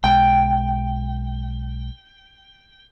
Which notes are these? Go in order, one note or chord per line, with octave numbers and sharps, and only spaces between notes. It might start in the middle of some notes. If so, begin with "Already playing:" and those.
B1 G#3 G5